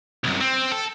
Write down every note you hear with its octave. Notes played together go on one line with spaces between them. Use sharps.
C2 F#2
C4
A4